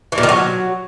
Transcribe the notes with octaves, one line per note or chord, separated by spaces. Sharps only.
E3
A#2
D#3
F#3